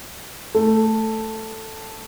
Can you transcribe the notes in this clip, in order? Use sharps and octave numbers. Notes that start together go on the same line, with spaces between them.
A3